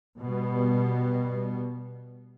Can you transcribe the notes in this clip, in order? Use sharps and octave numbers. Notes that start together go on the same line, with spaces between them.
B2 G3 B3